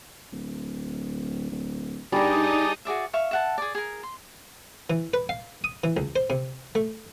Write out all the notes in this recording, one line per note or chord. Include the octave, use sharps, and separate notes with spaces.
D1
D1
G2 G3 D#4 G#4 A#4 D5 D#5 A5
F#4 G#4 D5 E5
E5 F5 C#6
E5 F#5 A5
G#4 D5
G#4 A#4
C6
E3
B4
F5
D#6
E3
C#2
C5
C3
A3